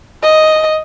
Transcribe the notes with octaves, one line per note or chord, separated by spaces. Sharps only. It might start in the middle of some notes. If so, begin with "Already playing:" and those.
D#5